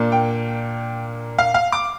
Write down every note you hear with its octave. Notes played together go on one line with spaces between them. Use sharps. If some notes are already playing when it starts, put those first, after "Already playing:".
Already playing: A#2 A#3 D4
G5
F5
F5
D6